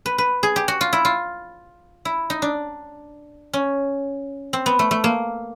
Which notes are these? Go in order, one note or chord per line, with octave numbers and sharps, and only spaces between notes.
B4
B4
G#4
G4
F#4
F4
E4
F4
E4
D#4
D4
C#4
C4
B3
A3
A3
A#3